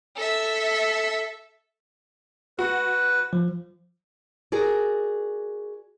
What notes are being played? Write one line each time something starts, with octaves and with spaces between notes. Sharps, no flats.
A4 E5
F#4 B4
F3
F#4 G#4 A#4 D5